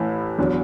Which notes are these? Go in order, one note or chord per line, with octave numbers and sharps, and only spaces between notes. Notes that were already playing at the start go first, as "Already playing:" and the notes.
Already playing: A1 A2 E3
E2 D3 F#3